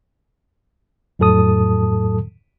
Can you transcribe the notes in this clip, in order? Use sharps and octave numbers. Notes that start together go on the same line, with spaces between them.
F2 A2 F#3 A4 A5 D#6